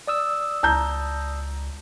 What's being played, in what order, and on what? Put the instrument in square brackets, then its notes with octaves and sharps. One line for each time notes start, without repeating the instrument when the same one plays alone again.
[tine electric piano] D5 D#6 E6
[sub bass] C#2 [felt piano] A5 A#5 G6